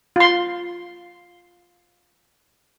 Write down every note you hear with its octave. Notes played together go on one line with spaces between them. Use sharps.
F4 C6